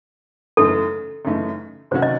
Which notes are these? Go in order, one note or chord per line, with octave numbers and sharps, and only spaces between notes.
F#2 C#3 E3 A3 D#4 A4
F#2 C#3 E3 A3 D#4
C3 D#3 F#3 C#4 F#4 C5
D#5